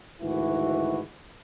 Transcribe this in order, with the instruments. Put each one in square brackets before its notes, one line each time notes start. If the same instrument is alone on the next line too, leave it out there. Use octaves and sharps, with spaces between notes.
[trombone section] D2 G#2 D#3 E3 E4 F#4